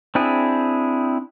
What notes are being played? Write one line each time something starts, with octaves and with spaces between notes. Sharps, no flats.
C4 D4 E4 G#4